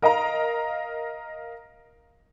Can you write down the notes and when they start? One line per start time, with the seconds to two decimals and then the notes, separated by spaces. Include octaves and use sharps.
0.02 A#4 D#5 F5 A#5